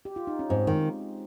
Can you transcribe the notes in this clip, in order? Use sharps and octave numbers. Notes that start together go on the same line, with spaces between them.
G4
F4
D#4
C#4
G#2 G#3 C4
D#3